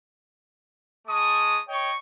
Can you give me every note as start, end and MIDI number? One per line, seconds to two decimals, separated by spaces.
1.08 1.60 56
1.08 1.60 81
1.08 1.60 85
1.08 1.60 87
1.69 1.92 73
1.69 1.92 75
1.69 1.92 79
1.69 1.92 85